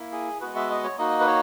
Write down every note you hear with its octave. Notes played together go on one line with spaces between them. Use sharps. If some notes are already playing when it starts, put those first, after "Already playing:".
Already playing: A#3 E4
G#4
G#3 B3 F#4 B4
E5
D#5
C#5
A#3 D#4 F#4 D#5
B4
C#5